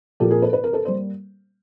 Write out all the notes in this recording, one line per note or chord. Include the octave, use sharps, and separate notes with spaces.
A#2 F3 A#3 G4 A4
G#4 A#4
A4 B4
B4
A#4
A4 B4
G3 A#3 C5